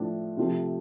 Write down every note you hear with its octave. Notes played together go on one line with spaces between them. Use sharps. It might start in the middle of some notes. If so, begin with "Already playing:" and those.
Already playing: A2 F3 A3 D4
C3 F3 A3